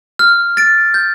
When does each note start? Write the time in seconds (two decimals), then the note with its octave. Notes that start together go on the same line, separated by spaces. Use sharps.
0.19 F6
0.57 A6 D7
0.94 G6